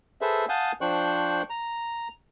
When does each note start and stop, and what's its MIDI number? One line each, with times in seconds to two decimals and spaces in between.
0.21 0.45 68
0.21 0.45 69
0.21 0.45 71
0.21 0.45 72
0.21 0.45 76
0.49 0.72 77
0.49 0.72 78
0.49 0.72 80
0.49 0.72 81
0.49 0.72 87
0.49 0.72 91
0.81 1.42 53
0.81 1.42 62
0.81 1.42 72
0.81 1.42 79
0.81 1.42 85
0.81 1.42 90
1.50 2.08 82